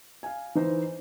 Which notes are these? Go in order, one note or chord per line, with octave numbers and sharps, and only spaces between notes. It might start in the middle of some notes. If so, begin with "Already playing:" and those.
F5 G#5
E3 D#4 C5